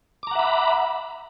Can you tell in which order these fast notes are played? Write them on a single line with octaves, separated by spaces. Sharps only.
D6 A#5 F#5 E5 B5